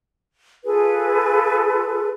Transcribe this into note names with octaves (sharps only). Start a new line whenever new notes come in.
F4 G#4 A4 B4